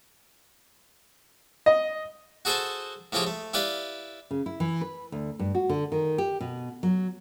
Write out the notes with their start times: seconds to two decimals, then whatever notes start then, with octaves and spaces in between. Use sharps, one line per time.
1.66 D#5
2.45 F#4 G#4 A4 C5 G#5 A5
3.12 A2 F3 C4 F4 G4 G#4
3.27 A3
3.54 E4 G4 B4 D5 F5
4.31 C#3
4.46 E4
4.60 E3
4.81 B4
5.12 D2
5.39 G2
5.55 F#4
5.69 D3
5.92 D#3
6.18 G4
6.41 B2
6.83 F#3